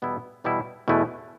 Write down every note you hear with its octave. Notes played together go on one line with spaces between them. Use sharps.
E2 B2 G3 B3 E4
E2 B2 G3 B3 E4
E2 B2 A3 E4 B4